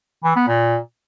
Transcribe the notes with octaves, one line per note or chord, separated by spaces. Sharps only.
E3
B3
A#2